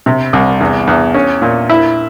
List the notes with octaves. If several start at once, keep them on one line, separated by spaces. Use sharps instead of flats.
C3
C2
E2
E2
C#4
A#2
E4